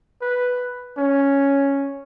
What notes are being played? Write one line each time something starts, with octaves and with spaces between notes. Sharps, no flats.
B4
C#4